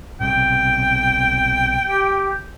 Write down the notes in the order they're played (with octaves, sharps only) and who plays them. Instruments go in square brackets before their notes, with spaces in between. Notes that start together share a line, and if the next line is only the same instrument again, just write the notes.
[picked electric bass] B1 C3 [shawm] G5
[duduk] G4